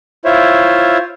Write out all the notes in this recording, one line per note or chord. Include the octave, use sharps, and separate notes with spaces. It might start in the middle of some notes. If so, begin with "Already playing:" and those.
E4 F4 C5 C#5 E5